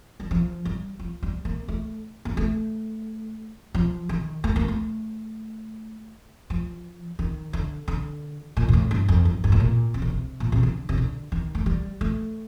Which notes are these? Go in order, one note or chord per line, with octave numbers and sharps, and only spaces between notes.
G3
F3
G3
F3
G3
A#3
A3
A#3
A3
F3
D#3
A3
A#3
A3
F3
D#3
D3
D3
A#2
G2
A2
G2
F2
G2
G2
A2
A#2
C3
D3
C3
A#2
C3
D3
C3
D3
D#3
A3
G3
A3